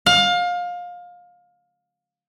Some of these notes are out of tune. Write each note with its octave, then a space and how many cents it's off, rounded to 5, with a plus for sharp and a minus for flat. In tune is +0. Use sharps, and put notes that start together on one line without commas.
F5 +25